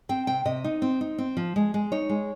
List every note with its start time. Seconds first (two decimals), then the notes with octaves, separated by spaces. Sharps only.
0.09 C4 G5
0.27 C3 G5
0.45 C3 D#5
0.64 D#4
0.82 C4
1.01 D#4
1.18 C4
1.37 F3
1.56 G#3
1.74 G#3
1.92 D#4 C#5
2.09 G#3